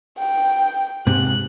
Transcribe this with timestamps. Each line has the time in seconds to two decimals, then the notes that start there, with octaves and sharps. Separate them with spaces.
0.18 G5
1.07 G#2 C3 F#6